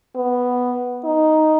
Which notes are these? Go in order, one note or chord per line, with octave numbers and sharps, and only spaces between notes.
B3
D#4